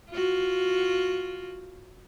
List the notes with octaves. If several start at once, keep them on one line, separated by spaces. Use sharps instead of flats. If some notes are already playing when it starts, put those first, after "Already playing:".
F4 F#4